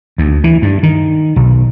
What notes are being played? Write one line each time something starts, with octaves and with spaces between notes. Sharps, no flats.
D2
E3
G2
D#3
B1